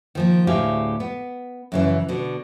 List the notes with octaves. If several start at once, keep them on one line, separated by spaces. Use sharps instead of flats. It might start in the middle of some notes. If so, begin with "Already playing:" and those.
D#3 F3 A#3
D2 A2 G4 G#4 E5 F5
B3
F#2 C#3 E3
B2 D3